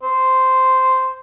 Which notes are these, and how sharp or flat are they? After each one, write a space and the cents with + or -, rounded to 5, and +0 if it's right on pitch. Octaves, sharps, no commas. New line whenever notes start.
C5 -5